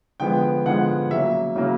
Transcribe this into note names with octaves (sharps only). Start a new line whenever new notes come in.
D3 F3 G#3 B3 G5
D3 F3 G#3 B3 F#5
C#3 F#3 A#3 E5
C#3 F#3 A#3